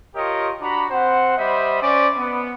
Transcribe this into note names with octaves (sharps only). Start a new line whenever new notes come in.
F4 G4 A#4 C#5 D#5
D4 F#4 A#5 B5
C4 C5 F#5
G3 C5 D#5 E5 B5
C#4 C5 D5
B3